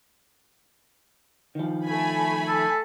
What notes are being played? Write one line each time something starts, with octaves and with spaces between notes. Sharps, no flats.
D#3 F3
A3 G#5 B5
A4